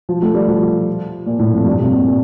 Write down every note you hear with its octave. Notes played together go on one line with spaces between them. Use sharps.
F3
A3
G3
F3
A#2
A2
F2
G2
C3
A#2
A#2